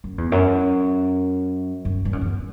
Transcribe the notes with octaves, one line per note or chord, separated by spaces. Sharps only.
F#2
E2
F#2
F#2
G2
F#2
E2